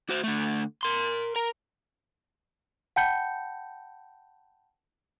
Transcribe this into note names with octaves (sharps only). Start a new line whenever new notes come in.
F#4 C5
D3 A3
A#4 C6
A#4
F#5 G5 A5 B5 G6 C#7